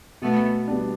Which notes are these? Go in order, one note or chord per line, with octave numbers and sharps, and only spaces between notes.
B2 A3 B3
G3 B3 D4